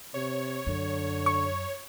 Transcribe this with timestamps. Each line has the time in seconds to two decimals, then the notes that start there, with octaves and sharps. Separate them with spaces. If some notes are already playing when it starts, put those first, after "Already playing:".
0.14 C3 C#5
0.67 F#2 D3
1.26 C#6